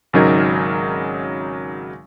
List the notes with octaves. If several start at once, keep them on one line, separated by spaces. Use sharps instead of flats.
G#1 C#3 F#3 D#4 A#4 G#6